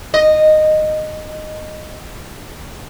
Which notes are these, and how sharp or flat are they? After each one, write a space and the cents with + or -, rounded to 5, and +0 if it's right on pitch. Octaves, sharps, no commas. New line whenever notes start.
D#5 -10